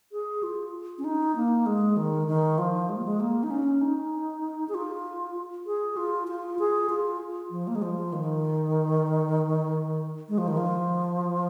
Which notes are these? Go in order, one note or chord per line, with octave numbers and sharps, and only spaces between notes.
G#4
F4
C#4
D#4
A#3
G#3
D#3
D#3
F3
G#3
A#3
G#3
A#3
D#4
C#4
D#4
G#4
F4
G#4
F4
F4
G#4
F4
F3
A#3
G#3
F3
D#3
G#3
F3
D#3
F3